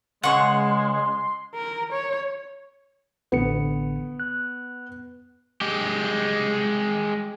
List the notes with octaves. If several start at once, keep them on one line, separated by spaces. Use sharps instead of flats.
C#2 C#3 G#3 F#5 C6 C#6
A#4
C#5
A1 D3 B3 C#7
F#6
G#3 G4